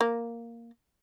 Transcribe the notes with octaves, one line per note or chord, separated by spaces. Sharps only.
A#3